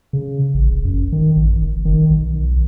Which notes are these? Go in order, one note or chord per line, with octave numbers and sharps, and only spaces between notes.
C#3
A1
F1
F#2
D#3
A1
F#1
D#3
B1